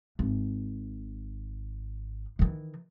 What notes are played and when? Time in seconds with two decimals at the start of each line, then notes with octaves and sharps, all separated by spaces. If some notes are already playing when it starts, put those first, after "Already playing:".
0.19 G#1
2.39 D#3 E3